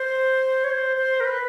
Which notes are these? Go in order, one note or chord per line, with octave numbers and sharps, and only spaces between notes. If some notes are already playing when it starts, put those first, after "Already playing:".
Already playing: C5
C#5
C5
C5
A#4
B4